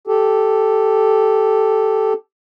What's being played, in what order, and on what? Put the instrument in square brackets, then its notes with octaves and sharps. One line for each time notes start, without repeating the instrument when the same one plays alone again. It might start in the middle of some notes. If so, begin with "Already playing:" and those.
[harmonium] G4 A4